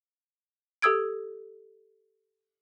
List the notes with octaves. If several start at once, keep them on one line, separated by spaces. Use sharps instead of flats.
G4 A4 D#6 E6 G#6 D7